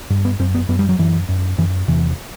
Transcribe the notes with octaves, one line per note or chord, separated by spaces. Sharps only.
G2
B3
F#2 C4
B3
F#2 B3
G3
F#3
F#2 E3
F#2
F#2 E3
E2 C3 E3